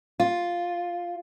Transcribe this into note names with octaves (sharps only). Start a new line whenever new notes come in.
F4